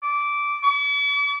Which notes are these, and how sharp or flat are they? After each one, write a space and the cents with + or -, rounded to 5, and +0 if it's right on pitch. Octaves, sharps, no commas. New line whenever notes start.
D6 -15
D6 -45